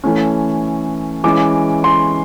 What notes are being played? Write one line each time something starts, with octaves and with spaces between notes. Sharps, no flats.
E3 A3 C#4
E3 G#3 C#4 D6
C6